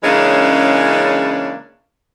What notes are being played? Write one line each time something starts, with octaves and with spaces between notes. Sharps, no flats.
C#3 E3 G#3 A#3 C#4 D4